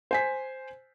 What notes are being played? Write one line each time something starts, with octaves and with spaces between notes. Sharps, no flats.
C5 G#5 B6